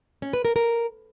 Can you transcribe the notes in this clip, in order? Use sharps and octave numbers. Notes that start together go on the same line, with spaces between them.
C#4
B4
A#4
A#4